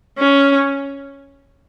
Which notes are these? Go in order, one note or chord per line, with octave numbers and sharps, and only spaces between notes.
C#4